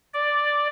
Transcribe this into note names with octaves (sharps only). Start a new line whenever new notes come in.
D5